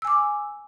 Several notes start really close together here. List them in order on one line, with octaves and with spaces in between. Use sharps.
E6 G#5 D6